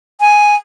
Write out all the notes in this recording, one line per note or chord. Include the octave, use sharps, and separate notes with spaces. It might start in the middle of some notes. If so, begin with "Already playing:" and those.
G#5